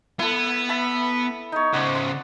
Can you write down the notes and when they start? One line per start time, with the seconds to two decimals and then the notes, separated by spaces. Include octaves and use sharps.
0.19 B3 E4 A4
0.69 E5 A5 B5
1.52 D#4 C#5
1.74 C#3 C5 D5 F#5
1.95 C6